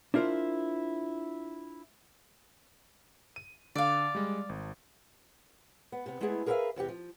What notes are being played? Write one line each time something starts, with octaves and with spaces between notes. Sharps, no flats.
D4 E4 F4 A#4 C5
D#7
D3 D5 F5
G3 G#3
G#1
B3
C3 B3
G#3 A3 B3 E4 G#4
G#4 A#4 B4 C#5 E5 F5
E2 C3 F#4 G4
F3